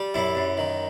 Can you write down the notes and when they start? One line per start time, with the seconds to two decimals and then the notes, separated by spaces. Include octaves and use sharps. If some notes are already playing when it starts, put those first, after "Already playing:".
Already playing: G3
0.14 F#2 E4
0.35 F#2
0.57 D#3